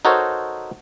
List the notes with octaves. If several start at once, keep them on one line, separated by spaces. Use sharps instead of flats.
D#4 F#4 A4 A#4 C5 C#5